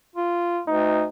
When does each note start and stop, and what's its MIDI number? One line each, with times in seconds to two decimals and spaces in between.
0.15 0.60 65
0.68 1.05 38
0.68 1.08 63